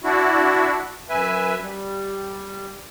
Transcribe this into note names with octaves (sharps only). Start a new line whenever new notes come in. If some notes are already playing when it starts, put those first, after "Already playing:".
D4 E4 F#4
F#2 B4 E5 G#5
G3